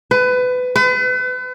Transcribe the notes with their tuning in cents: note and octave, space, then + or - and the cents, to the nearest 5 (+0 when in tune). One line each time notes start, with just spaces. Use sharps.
B4 +25
B4 +40